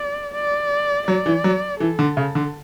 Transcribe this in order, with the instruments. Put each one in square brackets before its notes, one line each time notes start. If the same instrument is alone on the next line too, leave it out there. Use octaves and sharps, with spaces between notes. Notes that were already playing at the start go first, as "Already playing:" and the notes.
Already playing: [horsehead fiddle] D5
D5
[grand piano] F#3 [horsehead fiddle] D5
[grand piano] E3
F#3
[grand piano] E3 [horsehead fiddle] A4
[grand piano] D3
C#3
D3